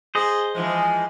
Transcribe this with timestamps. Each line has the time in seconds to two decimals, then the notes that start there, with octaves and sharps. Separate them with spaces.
0.15 G#4 C5 D#5
0.55 E3 F3 G#3